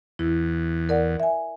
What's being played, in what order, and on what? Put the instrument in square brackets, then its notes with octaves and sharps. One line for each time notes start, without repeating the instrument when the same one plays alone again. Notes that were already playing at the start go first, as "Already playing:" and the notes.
[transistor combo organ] E2 [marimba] E4
[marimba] A#4 D5 F#5
E5 G#5